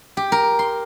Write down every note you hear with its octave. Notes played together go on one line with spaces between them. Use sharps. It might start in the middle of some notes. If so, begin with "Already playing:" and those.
G4
A#4
C6